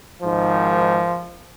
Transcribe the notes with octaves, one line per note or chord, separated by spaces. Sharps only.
G#1 G#2 D#3 F3